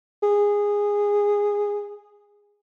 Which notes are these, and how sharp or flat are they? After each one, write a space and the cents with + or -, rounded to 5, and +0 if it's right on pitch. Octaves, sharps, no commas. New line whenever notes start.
G#4 -15